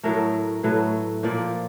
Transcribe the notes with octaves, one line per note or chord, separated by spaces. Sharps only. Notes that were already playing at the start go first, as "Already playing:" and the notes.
A2 F#3 A3 A#4
A2 F#3 A3 B4
A#2 F3 A#3 D5